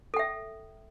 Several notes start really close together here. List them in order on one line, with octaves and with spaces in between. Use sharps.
A4 G5 E5